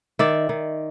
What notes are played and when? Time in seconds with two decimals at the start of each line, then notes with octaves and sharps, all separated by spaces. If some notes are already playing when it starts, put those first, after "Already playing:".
0.19 D#3 D5 E5
0.49 D#3